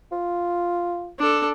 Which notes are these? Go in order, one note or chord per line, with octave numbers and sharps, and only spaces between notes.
F4
D4 A4